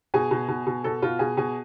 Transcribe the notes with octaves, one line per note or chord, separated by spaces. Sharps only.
B2 G#4
B2
B2
B2
B2 A4
B2 F4
B2 G#4
B2 G#4